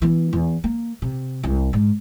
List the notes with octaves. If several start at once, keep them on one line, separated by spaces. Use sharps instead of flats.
E3 B3
E2
A#3
C3
C2
G#2